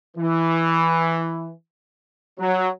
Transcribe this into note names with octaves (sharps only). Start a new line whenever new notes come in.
E3
F#3